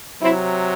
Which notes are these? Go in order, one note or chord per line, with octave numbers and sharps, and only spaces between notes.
C3 F#3 C4 E4